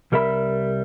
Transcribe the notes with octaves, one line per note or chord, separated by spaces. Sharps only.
C2 G3 A#4 E5 B5